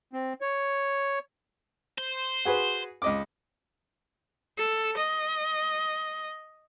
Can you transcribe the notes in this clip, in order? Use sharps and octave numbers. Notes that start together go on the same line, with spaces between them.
C4
C#5
C5
F#4 G#4 B4
C#2 D#5 D6
A4
D#5